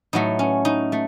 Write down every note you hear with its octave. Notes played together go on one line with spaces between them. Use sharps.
A2 F#3 A3 D#4
C#4
D#4
A3